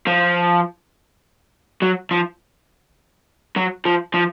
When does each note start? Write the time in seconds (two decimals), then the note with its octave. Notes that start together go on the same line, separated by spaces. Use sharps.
0.07 F3
1.82 F#3
2.11 F3
3.56 F#3
3.85 F3
4.14 F3